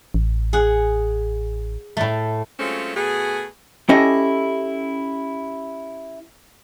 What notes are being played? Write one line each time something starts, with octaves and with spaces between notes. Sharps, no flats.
A1
G#4 F#5
A2 A3
F#3 G#3 A3 C4 C#4 F4
B2 A3 F#4 G#4
C#4 E4 G4 A4 D#5